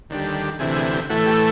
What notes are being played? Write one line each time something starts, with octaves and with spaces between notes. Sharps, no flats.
D#2 D3 G3
D2 C3 E3 G#4
G#4
G4
A2 E3 A3 F#4
G4